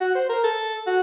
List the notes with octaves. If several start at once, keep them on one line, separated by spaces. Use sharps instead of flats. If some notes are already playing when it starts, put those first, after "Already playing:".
F#4
C5
A#4
A4
F#4